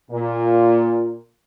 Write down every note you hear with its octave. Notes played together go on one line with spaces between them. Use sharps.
A#2